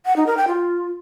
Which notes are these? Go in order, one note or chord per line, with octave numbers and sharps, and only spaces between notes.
F#5
D#4
A#4
G5
F4